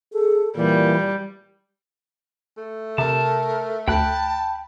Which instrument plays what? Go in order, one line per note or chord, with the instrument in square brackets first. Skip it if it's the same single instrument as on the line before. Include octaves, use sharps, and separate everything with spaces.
[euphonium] G#4 [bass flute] A4
[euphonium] A#2 [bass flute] E3 [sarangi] G3
[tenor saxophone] A3
[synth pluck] C3 [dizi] A#4 [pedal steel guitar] A5
[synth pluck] D2 [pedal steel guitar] G5 B5 F#6 [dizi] A5